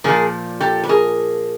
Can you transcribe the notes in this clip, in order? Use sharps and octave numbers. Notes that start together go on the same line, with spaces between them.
A#2 F3 G#4 A#4
G4 A4
B4
G#4 A#4